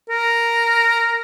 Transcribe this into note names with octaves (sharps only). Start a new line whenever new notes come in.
A#4